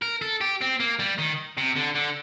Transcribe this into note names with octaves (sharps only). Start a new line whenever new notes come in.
A#4
A4
G4
C4
A#3
G3
D#3
C3
D3
D3